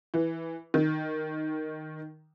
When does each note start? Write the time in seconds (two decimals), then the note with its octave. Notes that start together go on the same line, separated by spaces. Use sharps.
0.14 E3
0.74 D#3